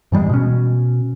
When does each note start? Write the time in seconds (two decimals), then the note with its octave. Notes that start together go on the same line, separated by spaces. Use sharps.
0.12 G#2 E3 G3 G#3
0.29 B2 C#4